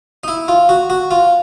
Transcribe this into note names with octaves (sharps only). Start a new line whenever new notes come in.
D#4
E4
F4
F#4
F#4
F4